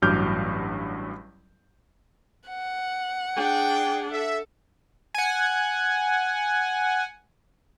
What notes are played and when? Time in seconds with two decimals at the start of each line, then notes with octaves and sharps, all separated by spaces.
0.02 A1 G2 F#3 D6 F6 G6
2.48 F#5
3.36 D4 G#4 G5
4.12 A4 E5
5.14 F#5 G#5